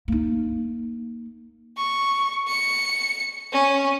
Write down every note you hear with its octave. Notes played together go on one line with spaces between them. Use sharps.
A#3 D#4
C#6
C#7
C#4